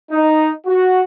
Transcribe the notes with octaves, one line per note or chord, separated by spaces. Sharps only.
D#4
F#4